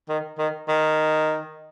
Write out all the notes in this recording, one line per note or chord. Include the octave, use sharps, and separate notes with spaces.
D#3
D#3
D#3